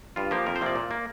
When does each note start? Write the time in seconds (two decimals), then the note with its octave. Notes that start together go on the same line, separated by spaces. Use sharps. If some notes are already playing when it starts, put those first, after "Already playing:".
0.16 G2 F4
0.31 F3 A#3 G4
0.46 F2 A#4
0.56 C5
0.61 C3 F3 A#3 D5
0.76 A#2
0.91 A#3